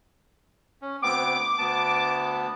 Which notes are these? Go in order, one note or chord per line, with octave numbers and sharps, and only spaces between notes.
C#4
D2 B3 C4 D6
D2 B3 A5